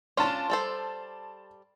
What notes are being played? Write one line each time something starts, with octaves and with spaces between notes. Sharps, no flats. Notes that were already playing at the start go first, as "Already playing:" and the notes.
C#4 D4 F4 A5 C6
G3 A4 C5